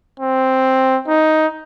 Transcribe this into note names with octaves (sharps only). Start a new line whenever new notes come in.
C4
D#4